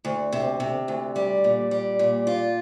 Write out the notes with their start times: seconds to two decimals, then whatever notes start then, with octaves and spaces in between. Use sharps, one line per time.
0.05 D2
0.32 C3
0.60 C3
0.88 D2
1.16 G3
1.44 A#2
1.71 G3
1.99 A#2
2.27 F4